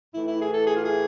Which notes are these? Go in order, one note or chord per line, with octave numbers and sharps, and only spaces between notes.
A2 E3 A3 E4
E4
G#4
A4
G#4
F4
G#4